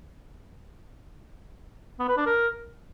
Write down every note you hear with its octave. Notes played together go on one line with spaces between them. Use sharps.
B3
B4
D4
A#4